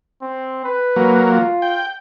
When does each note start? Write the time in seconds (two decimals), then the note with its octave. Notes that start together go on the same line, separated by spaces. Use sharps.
0.22 C4
0.65 B4
0.96 F#3 A#3
1.31 F4
1.62 G5